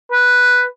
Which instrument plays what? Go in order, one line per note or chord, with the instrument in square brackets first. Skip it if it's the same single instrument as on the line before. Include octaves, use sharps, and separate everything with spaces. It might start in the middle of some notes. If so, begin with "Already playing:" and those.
[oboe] B4